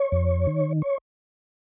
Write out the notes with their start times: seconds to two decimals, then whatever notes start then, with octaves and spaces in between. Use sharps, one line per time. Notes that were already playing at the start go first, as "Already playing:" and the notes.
Already playing: C#5
0.12 F2
0.47 D#3
0.82 C#5